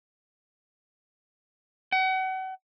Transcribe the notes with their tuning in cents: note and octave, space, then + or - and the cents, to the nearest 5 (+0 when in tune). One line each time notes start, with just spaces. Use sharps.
F#5 +35